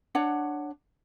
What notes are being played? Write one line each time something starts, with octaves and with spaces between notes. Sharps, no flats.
D4 C#5 F#5